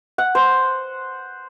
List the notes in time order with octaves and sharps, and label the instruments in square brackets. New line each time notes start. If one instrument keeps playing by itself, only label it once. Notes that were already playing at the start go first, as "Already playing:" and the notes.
[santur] F#5
C5